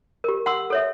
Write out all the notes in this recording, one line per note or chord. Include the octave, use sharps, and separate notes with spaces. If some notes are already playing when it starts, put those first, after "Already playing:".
G4 A#4
F#5 C6 E6
A4 C#5 E5